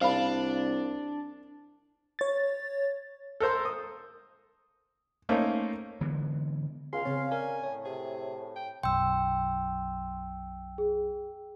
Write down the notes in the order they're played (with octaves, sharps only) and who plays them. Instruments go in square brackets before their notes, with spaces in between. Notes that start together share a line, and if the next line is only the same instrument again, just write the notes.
[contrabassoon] C2 [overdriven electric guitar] D4 [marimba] C5 B5 [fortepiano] F5
[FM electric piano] C#5 A6
[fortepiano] A4 A#4 C5 C6
D#6
A3 A#3 C#4 D#4 C5
[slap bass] D3 E3 G#3 B3
[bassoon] C#2 [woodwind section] F5 [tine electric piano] G#5 [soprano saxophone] C6
[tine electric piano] C#3 C4 [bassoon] C#4
[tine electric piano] A#4 D5 [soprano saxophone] G#5
[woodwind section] A2 [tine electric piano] C#5
[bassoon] C3 [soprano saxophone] G#4
[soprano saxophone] G5
[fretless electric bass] B1 F#2 [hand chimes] G5 E6 [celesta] C6
[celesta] G#4